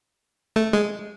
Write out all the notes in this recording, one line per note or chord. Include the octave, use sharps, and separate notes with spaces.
A3
G#3